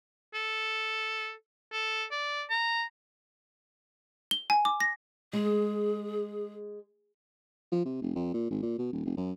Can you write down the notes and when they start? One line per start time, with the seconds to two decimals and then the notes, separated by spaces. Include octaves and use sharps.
0.34 A4
1.72 A4
2.11 D5
2.50 A#5
4.31 G7
4.50 G#5
4.65 D6
4.80 A#6
5.33 G#3 G#4
7.72 F3
7.85 C3
8.02 F1
8.15 F2
8.34 A#2
8.51 G#1
8.63 A#2
8.78 B2
8.92 D#1
9.05 F1
9.17 F#2